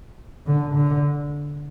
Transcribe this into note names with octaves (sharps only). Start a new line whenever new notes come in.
D3
D3